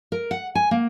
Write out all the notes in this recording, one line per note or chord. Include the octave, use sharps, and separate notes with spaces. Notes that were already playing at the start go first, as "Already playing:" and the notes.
A#4
F#5
G#5
A#3